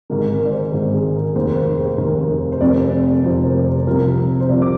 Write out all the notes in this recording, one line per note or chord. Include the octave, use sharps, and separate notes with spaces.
G#1 G#2 D#3 A#4
A#4
D5
C5
G#1 G#2 D#3 A#4
G#4
A#4
F1 D#2 D#3 C5
C5
G#4
F1 D#2 D#3 A#4
C5
F1 F2 C3 F3 D5
F1 F2 C3 F3 C5
A#4
C2 C3 F3 A#4
C5
C2 C3 F3 D5
D6